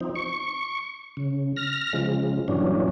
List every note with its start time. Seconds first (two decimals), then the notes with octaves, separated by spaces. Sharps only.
0.01 F3 C4 D#4
0.15 C#6
1.17 C#3
1.56 F6 A#6
1.93 C#3 F3 G#3
2.48 G2 A#2 E3 F#3 C#4 D4